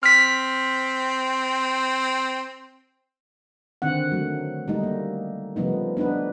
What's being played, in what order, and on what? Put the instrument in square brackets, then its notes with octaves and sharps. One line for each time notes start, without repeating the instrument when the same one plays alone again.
[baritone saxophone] C4 [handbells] F6 B6
[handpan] D3 D#3 C4 F#5
F#3 A3
G3 A3 D#4
A#3
C#3 F3 G3 A3 B3 D#4
B3 D4 D#4 B4